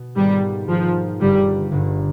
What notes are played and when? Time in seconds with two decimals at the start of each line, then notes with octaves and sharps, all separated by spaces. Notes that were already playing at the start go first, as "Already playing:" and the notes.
Already playing: B2
0.15 G#2 D#3 G3 B3 F4
0.68 G#2 D#3 F3 B3 F4
1.20 G1 G2 D3 G3
1.72 G1 G2 D3